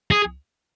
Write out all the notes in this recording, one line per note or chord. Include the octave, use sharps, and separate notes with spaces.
G#4